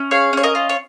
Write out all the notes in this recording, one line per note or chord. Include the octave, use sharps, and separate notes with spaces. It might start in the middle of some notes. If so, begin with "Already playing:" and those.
Already playing: C#4
G#4 C#5 F5
C#4 C#5
A#4 D#5
F4
C#5